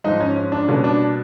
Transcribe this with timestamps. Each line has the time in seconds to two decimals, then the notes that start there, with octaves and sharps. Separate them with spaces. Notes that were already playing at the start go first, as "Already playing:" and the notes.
0.04 G#2 F3 G#3 D#4
0.20 C#4
0.36 C#4
0.52 D4
0.68 B2 G3 A#3 C#4
0.84 D4